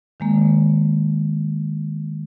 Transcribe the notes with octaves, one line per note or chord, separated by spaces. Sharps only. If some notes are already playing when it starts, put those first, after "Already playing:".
D#3 G#3 A#3